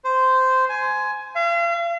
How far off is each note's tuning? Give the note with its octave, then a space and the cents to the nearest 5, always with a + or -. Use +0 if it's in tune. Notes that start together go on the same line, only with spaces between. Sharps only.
C5 -10
G#5 +15
F5 -40